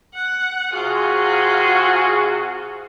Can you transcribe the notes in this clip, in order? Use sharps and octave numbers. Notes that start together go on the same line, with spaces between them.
F#5
C3 F4 F#4 G#4